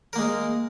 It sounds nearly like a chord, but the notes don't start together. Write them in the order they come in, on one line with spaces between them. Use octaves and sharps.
A#4 A#3 G#3